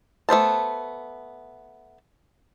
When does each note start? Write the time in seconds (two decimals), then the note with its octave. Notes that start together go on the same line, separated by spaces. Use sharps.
0.29 A3 B3 C5 A5